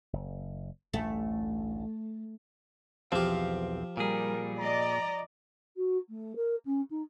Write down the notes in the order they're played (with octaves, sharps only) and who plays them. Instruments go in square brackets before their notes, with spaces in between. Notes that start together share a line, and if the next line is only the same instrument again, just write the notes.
[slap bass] F#1
[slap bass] A1 D2 G2 [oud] A3
[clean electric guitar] B1 E2 C4 [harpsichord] F3 G4 [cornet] F5
[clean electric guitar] A#2 G#4 [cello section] G3 [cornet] A#4
[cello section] D5 D#5 [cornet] A#5
[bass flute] F#4
A3
A#4
C#4
D#4